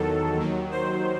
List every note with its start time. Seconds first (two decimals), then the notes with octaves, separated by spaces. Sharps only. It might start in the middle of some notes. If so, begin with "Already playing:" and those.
Already playing: E2 D#3 F#3 A4
0.37 D#2 D#3 F#3
0.71 C5